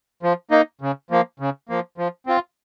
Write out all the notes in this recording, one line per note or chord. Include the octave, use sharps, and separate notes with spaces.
F3
A#3 D#4
C#3
F3 A#3
C#3
F3 A#3
F3
C4 F4